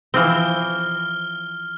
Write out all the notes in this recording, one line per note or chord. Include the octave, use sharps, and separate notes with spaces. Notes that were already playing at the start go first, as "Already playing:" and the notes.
E3 F3 C4 F6 G7